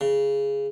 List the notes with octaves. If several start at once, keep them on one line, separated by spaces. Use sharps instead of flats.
C#3